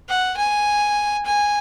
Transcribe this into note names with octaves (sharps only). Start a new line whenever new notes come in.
F#5
G#5
G#5